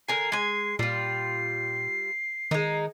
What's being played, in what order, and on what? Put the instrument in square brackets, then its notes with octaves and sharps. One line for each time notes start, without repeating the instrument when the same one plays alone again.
[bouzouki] D3 A#4 G#5 [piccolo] C7
[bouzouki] G#3 G#5
[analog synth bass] A#2 [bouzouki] G3 F4 [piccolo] C7
[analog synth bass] D#3 [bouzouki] G#3 D#4